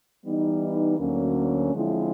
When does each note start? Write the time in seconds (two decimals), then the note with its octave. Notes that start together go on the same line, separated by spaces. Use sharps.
0.25 E3 G3 B3 D#4
0.99 D2 D3 F#3 A#3 C#4
1.73 D3 F3 G#3 C4 E4